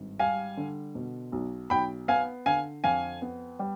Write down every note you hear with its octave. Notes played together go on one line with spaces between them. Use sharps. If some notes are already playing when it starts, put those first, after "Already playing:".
Already playing: G#1 G2
G3 F5 G#5
D3
B2
B1
B1 G5 B5
B3 F5 G#5
D3 F5 G#5
F2 F5 G#5
B3
G3